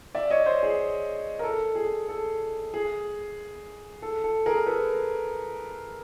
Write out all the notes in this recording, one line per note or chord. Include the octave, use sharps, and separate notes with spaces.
D5 E5
C#5 D#5
C5 D5
G#4
A#4
A4
G#4
A4
G#4
A4
A4
G#4 A#4
A4 B4